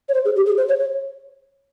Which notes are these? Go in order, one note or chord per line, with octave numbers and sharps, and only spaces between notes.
C#5
C5
G#4
G4
G#4
C5
C#5
C#5